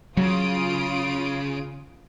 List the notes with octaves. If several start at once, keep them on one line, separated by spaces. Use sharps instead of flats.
C#3 F#3 F4 D#6 D7